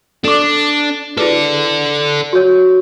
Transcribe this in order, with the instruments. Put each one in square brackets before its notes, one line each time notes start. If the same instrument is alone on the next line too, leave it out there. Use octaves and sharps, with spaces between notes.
[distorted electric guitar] D4 [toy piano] A4 D6
[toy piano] E4 G#4 B4 [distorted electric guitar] A4 D5
[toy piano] F#4 C#5